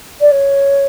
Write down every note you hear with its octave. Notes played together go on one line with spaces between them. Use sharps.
D5
C#5